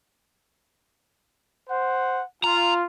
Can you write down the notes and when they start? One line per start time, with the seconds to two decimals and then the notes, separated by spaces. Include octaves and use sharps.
1.70 C5 F#5
2.44 F4 A#5